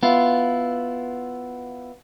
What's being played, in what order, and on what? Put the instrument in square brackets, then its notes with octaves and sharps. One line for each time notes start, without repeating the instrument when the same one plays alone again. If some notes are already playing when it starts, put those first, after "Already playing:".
[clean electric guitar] B3 E4 F4